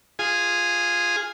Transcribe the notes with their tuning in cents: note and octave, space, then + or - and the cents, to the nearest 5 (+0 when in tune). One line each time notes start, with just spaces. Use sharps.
F4 +0 G#4 -5